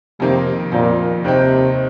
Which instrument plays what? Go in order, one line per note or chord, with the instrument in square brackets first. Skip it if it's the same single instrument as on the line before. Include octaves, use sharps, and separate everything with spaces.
[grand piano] F2 D#3 A#3 [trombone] C3
[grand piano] F2 D#3 A#3 [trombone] A#2
[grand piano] D#2 D#3 C4 D#4 G4 [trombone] C3